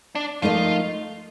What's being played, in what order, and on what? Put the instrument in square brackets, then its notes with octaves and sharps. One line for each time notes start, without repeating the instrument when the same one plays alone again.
[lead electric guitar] D4
[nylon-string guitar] F3 A3 D#4 A#4 D#5 [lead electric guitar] F4